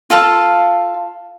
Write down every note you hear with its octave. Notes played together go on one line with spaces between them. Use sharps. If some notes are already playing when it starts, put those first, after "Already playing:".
F4 A4 F5 A5